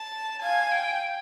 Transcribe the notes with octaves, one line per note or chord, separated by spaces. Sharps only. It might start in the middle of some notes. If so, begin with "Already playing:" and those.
Already playing: A5
F5 G#5
G5